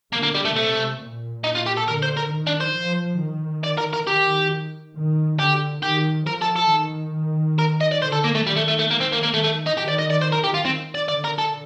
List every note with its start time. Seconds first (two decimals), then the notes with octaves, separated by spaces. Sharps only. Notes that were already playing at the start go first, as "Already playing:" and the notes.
0.12 D3 A#3
0.23 A#3
0.35 G3
0.45 A3
0.56 C3 A3
1.01 A#2
1.44 D#4
1.55 F4
1.66 G4
1.77 A4
1.87 D3 A#4
2.02 C5
2.17 A#4
2.32 D#3
2.47 D4
2.61 C5
2.76 F3
3.20 D#3
3.63 D5
3.78 A#4
3.93 A#4
4.07 D#3 G4
4.95 D#3
5.39 D3 G4
5.83 D#3 G4
6.26 F3 A#4
6.41 A4
6.56 A4
6.70 D#3
7.59 A#4
7.81 D#5
7.92 D5
8.02 D3 C5
8.12 A4
8.24 A#3
8.35 A3
8.46 D#3 G3
8.56 A3
8.68 A3
8.79 A3
8.90 A#3
9.00 C4
9.12 A#3
9.23 A#3
9.34 A3
9.44 A3
9.67 D#4
9.78 D#3 G4
9.88 D5
9.99 D#5
10.11 D5
10.22 C5
10.32 A#4
10.44 G4
10.54 F4
10.65 C4
10.95 D5
11.09 D3 D5
11.24 A#4
11.38 A4